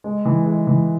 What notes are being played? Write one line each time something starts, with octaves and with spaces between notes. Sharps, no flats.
G#3
E3
G#3
E3